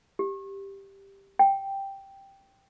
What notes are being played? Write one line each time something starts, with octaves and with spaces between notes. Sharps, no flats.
G4
G5